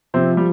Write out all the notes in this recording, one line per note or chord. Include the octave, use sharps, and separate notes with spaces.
C3 F3 C4
G3